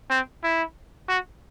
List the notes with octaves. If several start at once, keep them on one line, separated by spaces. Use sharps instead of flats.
C4
E4
F#4